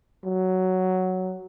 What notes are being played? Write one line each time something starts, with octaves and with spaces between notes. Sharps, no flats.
F#3